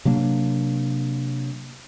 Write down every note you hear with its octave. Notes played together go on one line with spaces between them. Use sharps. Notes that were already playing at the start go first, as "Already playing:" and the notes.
C3 F#3 A#3 D4